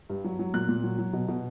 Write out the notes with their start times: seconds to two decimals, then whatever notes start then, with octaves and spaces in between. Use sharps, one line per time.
0.10 G2
0.24 F#3
0.39 F#3
0.54 A#2 F#6
0.69 A#2
0.84 F#3
0.98 F#3
1.13 B2
1.28 B2